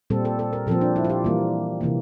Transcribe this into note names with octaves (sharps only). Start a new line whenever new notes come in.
A#2 G3 C4 A4
A4
A4
A#4
A#2 F3 C4 A4
D4
E4
F4
G4
E3 G3 A#3
C3 E3 A#3